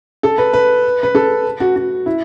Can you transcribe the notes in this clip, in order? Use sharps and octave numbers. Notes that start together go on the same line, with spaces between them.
A4
B4
B4
B4
A4
F#4
F#4
E4